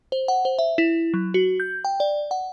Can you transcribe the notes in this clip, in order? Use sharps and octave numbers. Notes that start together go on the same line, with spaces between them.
C5
F#5
C5
E5
E4
F#3
F#4
G6
G5
D5
F#5